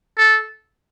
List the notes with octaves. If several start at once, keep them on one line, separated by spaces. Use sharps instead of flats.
A4